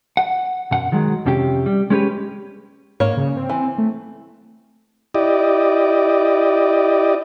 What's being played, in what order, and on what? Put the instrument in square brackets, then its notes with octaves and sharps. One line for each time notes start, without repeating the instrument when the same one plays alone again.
[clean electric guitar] F#5
B1 F#2 F#5
D#3 F#3 G#3
F2 C3 C#4 G4
G3
G#3 C#4 G4 B4
[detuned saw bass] G#2 [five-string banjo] A#3 C#5
[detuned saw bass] C#3
C4
[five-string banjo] E3
[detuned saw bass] A3
[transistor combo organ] E4 G4 D5 D#5